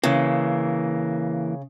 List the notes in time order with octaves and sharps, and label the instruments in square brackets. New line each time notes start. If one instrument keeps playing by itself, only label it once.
[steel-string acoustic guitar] C#3 [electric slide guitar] E3 A#3